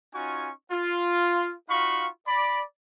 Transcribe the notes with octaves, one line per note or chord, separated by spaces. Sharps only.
C#4 D#4 F4 F#4 G#5 C#6
F4
D#4 F4 F#4 F5 B5 C#6
D5 B5